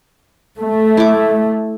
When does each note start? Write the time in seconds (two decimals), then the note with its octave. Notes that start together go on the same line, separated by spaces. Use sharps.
0.61 A3
0.97 E4 D6